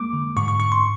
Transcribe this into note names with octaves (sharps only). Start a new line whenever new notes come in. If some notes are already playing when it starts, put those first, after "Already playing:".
Already playing: G#3 A#3 D6
D3
G#2 C#6
C#6
G#2 C#6
C6